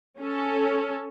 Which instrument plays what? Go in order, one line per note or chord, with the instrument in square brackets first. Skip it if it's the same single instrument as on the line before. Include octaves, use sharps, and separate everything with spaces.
[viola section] C#4 A4